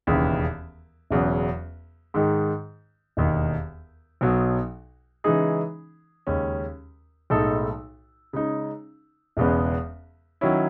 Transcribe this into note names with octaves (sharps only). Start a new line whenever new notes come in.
E1 D#2 C#3 E3
E1 E2 C#3 F#3
G#2 D#3 G#3
E1 D#2 D#3
B1 B2 F#3
C#3 E3 G#3 D#4 G#4
D#2 C#3 G#3 C#4
B1 A2 G#3 D#4 A4
C#3 G#3 D#4
E1 E2 C#3 G#3 B3
D#3 F#3 C#4 E4